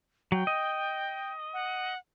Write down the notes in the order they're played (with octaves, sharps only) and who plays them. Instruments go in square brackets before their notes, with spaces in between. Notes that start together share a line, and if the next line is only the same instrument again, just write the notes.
[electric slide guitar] F#3 [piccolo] G5
[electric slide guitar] D#5
[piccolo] F#5